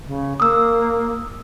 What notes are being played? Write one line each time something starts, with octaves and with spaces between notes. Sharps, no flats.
C#3
A#3 D#6 E6